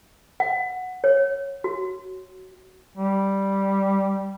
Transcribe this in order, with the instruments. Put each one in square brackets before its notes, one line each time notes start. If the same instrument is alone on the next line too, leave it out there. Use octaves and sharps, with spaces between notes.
[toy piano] F#5
C#5
F#4
[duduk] G3